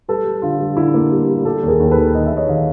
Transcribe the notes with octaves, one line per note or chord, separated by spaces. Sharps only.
G3 A4 B4
G3
D3 F4
G3
D3 E4
A#3
G3
G3
G3 G4 A4
D#2
G#4 A#4
D#2
A4 B4
D#3
D#3 D#5
E5
D#2
C#5 D#5
D#3 D#5 F5